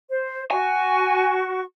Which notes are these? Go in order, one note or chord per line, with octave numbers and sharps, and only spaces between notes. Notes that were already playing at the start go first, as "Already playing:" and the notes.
C5
F#4 G#5 C#6